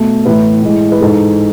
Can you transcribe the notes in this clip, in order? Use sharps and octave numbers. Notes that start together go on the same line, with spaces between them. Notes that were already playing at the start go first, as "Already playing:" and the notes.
Already playing: B2 A3
A2 E3 A3 B4
A2 G#3
B4
G#2 E3 G#3 A4